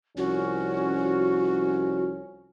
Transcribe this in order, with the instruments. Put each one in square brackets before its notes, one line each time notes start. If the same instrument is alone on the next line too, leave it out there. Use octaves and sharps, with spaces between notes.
[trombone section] C2 F3 C#4 [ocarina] F#4